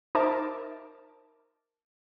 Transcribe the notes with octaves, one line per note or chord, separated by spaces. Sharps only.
D#4 A#4 C5 E5 A5 D6